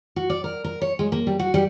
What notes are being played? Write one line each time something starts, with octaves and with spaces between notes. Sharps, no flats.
F#4
D5
A#4
A#4
C#5
G#3
A#3
G3
F#4
G3